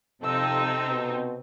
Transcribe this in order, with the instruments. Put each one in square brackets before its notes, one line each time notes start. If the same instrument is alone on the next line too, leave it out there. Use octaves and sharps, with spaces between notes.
[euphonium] F2 [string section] C3 C4 D#4 [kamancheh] A4 E6
[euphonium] B2